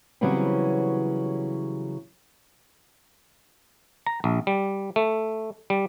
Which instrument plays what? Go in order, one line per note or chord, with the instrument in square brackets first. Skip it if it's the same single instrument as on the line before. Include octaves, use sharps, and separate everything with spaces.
[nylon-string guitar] C#3 E3 F#3 G3 B3 C4
[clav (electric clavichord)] A#5
A#1
G3
A3
G3